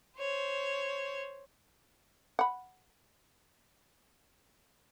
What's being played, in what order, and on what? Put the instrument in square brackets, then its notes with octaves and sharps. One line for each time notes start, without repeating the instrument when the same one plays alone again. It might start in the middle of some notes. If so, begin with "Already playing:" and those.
[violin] C5 C#5
[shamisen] F#5 B5